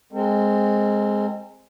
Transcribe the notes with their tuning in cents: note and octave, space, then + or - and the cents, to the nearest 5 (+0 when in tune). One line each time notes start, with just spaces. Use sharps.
G#3 +0 C4 +0 A#4 -45